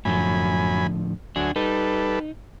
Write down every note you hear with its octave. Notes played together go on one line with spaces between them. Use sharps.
F#2 A2 D3 F3 G#5 B5
D2 F#3 D4 G#5
G3 D#4 A4 B4